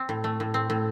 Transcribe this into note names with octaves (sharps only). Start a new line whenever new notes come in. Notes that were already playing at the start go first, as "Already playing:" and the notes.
Already playing: C4
A2
A3
A2
C4
A2